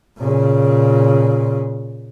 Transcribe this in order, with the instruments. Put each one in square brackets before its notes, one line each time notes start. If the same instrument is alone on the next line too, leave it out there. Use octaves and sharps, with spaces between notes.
[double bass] A#2 C#3